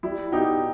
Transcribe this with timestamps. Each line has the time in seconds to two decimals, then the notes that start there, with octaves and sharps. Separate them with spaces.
0.03 G3 E4
0.32 B2 D#4 G4